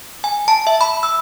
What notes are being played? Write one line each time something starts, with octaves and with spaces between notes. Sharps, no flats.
G#5
A5
E5
B5
E6